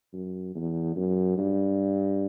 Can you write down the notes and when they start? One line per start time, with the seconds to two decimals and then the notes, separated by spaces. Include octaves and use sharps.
0.13 F#2
0.55 E2
0.96 F#2
1.37 G2